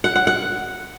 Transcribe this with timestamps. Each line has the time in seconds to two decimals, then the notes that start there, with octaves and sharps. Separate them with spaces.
0.04 F#5
0.16 F#5
0.27 F#5